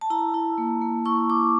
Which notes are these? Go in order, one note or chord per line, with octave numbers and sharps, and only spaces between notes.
A5
E4 A#5
E4
A#3
A#3
E4 C#6
E4 D6